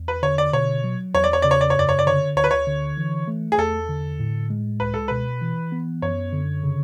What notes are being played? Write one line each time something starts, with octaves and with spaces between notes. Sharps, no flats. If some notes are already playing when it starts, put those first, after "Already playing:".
Already playing: E2
B4
D3 C#5
D5
B2 C#5
F#3
E2 C#5
D5
C#5
C#3 D5
C#5
D5
C#5
F#2 D5
C#5
D5
D3 C#5
D2 C#5
B4
C#5
D3
E3
A3
G#4
E2 A4
D3
A2
G#3
C#2 B4
A4
B2 B4
E3
B3
F#2 C#5
D3
C#3